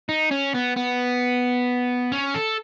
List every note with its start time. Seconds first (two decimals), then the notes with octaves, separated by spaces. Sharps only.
0.09 D#4
0.31 C#4
0.54 B3
0.76 B3
2.12 C#4
2.35 A4